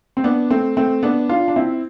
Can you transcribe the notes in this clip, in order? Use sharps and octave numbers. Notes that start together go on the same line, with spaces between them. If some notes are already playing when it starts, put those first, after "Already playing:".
C4
B3 D4
A3 C4
A3 C4
B3 D4
D4 F4
D4
C4 E4